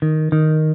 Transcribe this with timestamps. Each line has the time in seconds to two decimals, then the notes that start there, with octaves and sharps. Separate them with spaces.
0.02 D#3
0.32 D#3